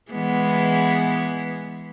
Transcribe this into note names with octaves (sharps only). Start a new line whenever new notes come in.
E3 G#3 B3